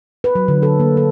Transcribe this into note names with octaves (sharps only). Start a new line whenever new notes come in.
B4
F#3
D3
A4
A#3
A4